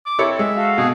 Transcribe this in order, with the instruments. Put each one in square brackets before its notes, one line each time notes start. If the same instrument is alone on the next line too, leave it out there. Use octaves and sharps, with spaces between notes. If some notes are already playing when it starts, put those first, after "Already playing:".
[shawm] D6
[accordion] C4 [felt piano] E4 A4 C#5
[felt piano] G#3 [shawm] E5
[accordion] F#4 A4 F5
[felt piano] B2 [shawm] G#4